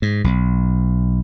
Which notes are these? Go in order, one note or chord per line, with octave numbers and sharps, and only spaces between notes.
G#2
B1